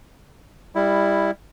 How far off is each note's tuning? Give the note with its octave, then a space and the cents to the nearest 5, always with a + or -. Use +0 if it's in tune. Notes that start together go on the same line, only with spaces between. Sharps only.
G3 +20 E4 +0